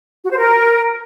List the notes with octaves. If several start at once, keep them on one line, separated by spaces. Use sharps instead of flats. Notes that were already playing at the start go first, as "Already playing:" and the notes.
F#4
C5
A#4